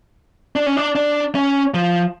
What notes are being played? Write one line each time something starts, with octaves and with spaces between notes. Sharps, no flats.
D4
C#4
D4
D4
C#4
F3